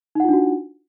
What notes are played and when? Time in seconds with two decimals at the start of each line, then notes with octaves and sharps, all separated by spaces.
0.15 D#4
0.20 F#5
0.24 F4
0.29 D4
0.33 F#4